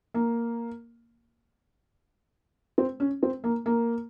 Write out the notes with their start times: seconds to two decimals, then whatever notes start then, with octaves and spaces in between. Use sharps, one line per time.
0.14 A#3
2.78 C4
3.00 C#4
3.23 C4
3.44 A#3
3.66 A#3